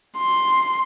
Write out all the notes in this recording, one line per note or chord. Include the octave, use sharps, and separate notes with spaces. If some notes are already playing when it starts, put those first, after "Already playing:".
C6